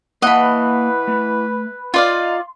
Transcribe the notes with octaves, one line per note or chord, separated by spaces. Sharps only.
E3 A#3 B4 D#5 F5 F#5 A5 B5
A3
D#4 F4 D5 F5 C6